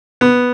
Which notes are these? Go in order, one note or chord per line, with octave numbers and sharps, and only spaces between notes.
B3